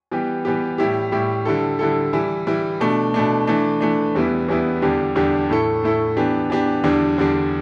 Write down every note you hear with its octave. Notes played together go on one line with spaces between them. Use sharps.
E3 G3 B3 G4
E3 G3 B3 G4
A2 G3 E4 G4
A2 G3 E4 G4
D3 G3 E4 A4
D3 G3 E4 A4
E3 G3 E4
E3 G3 E4
B2 A3 D4
B2 A3 D4
E3 A3 D4
E3 A3 D4
E2 E3 G3 B3 E4
E2 E3 G3 B3 E4
E2 D3 G3 D4 G4
E2 D3 G3 D4 G4
A2 A3 E4 A4
A2 A3 E4 A4
E3 B3 D4 G4
E3 B3 D4 G4
E2 D3 G3 D4
E2 D3 G3 D4